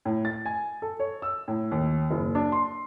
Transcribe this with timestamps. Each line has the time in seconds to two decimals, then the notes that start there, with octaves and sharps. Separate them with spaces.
0.05 A2
0.25 A6
0.46 G#5
0.82 A4
0.99 C#5
1.22 E6
1.48 A2
1.71 D#2
2.11 F#1
2.35 D4
2.52 C6